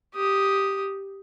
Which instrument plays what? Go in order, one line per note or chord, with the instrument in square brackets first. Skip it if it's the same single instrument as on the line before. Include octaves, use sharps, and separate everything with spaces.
[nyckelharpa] G4 D#6